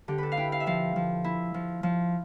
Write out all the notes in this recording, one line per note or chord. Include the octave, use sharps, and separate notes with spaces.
D3 G4
A4 B4
F5
E4 G5
F5
E5
F3 F5
F3
E4
F3
F3